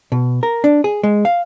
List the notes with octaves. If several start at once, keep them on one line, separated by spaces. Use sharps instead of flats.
B2
A#4
D4
G#4
G#3
F5